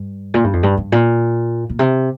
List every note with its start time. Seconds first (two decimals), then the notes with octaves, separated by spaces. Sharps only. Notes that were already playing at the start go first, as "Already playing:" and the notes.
Already playing: G2
0.34 A#2
0.44 G2
0.53 F2
0.63 G2
0.77 G2
0.92 A#2
1.70 A#2
1.79 C3